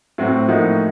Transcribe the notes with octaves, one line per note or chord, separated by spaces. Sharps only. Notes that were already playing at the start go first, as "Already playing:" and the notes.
A2 F#3 C4 F#4
A2 F3 A#3 D#4 F#4